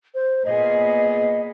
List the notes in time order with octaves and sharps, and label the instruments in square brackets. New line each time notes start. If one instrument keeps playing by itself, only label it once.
[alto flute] C5
[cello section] A#2 B3 G#4 [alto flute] D#5